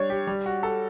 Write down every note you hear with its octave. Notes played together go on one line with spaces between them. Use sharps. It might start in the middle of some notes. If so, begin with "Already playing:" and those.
Already playing: G3 D4 C#5
G4
G3
F#4
A4